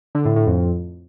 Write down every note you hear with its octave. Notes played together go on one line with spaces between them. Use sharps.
D3
A2
A2
F2